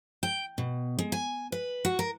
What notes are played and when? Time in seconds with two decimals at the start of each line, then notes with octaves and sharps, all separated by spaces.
0.23 G5
0.58 B2
0.99 G#3
1.12 G#5
1.52 B4
1.85 F#4
1.99 A#4